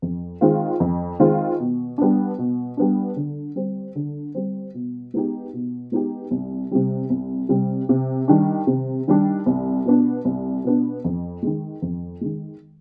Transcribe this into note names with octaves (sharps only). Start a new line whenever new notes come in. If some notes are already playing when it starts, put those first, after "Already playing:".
F2
D#3 G#3 C4 F4
F2
D#3 G#3 C4 F4
B2
G3 B3 D4
B2
G3 B3 D4
D3
G3 C4
D3
G3 C4
B2
G#3 B3 D#4 G4
B2
G#3 B3 D#4 G4
C2
C3 G3
C2
C3 G3
C3
D#3 G3 D4
C3
D#3 G3 D4
C2
B2 B3 D4
C2
B2 B3 D4
F2
D#3 G#3
F2
D#3 G#3